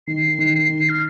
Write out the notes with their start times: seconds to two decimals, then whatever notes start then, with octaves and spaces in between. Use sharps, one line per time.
0.07 D#3 C7
0.38 D#3
0.69 D#3
0.89 F6